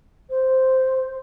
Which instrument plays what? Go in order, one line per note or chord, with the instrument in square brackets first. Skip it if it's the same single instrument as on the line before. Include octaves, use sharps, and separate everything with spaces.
[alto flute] C5